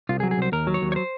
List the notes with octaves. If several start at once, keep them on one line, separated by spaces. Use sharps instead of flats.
C2 F4
G#4
F#3
G#4
C2 C5
D#2 A#4
F#3
C#5
D#2
C#5
C5